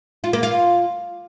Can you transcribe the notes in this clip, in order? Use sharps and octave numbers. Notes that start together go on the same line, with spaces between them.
F4
A#3
F4